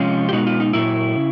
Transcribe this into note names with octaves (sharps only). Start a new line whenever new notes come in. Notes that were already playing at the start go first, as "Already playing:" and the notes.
Already playing: C3 F3 G#3 C#4 F4
G4
B2 G#3 B3 D#4 F#4
F4
D#4
A#2 F#3 A#3 E4
C#3